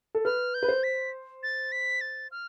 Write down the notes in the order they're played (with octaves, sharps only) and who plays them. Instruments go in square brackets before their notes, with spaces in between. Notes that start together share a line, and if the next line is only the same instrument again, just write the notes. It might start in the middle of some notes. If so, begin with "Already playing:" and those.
[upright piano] A4
[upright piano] B4 [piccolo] F6
[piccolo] G6
[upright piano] B4
C5
[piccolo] B6
A6
B6
A6
F6